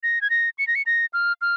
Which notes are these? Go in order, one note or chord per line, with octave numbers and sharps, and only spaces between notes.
A#6
G#6
A#6
C#7
A#6
C#7
A#6
F6
F6